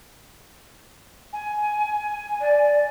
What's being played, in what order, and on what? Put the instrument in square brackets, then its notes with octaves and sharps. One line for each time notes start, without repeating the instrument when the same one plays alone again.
[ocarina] G#5
[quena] D5